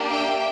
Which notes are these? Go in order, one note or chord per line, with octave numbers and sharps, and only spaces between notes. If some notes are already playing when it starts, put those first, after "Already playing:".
Already playing: A#3 D4 G4
E5 G5